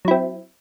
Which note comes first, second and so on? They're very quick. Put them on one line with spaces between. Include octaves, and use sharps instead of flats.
F#3 E4 C4